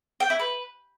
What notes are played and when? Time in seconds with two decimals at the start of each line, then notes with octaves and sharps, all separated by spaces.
0.20 G5
0.30 E4
0.39 B4